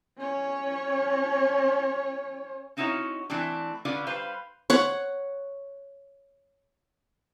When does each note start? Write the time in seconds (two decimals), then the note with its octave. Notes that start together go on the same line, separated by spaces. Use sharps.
0.18 C#4 C#5
2.77 C4 C#4 D#4 E4 F#4 C#5
3.30 E3 A3 C4 D4
3.85 D3 C#4 F4 B4 D5
4.07 G3 B4 C5 F5
4.70 C#5 F#5